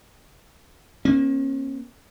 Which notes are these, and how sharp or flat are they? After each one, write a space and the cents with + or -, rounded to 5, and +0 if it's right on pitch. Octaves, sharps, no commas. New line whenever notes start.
A#3 +25 C#4 -35